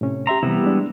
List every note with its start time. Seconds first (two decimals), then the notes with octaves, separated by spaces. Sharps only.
0.01 A2 C3 C#4
0.27 G4 E5 A#5 C6
0.43 C3 E3 G3 B3 E4
0.63 G#3 D4